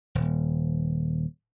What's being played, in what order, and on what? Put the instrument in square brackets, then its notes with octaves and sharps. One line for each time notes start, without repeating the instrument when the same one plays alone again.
[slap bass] D#1